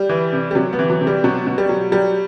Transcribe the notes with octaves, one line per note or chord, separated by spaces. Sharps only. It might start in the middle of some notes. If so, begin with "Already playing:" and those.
Already playing: G3
E3
C3
G3
C3 F#3
B3
E3
F#3
C3
G3
B2 F#3
B2
G3
F#3
F#3 G3